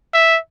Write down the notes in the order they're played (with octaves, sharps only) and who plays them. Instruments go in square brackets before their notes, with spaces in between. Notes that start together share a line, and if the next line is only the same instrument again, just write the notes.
[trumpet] E5